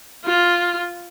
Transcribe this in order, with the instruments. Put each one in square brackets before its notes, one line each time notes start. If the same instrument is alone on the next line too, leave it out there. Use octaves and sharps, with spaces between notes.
[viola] F4